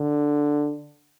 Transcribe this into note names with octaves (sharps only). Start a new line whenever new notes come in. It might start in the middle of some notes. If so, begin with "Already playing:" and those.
Already playing: D3